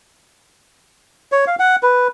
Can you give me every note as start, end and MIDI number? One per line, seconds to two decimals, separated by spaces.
1.32 1.45 73
1.47 1.56 77
1.59 1.76 78
1.83 2.08 71